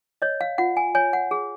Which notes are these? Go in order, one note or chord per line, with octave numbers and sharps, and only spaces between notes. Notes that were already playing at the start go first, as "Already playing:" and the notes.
C#5 D#5
F5
F4 F#5
G#5
C#5 G#5
F#5
G#4